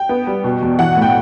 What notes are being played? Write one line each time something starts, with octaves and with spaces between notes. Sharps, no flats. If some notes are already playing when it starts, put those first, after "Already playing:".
Already playing: G5
B3
G3
B2
E2
E3 F#5
A2
G5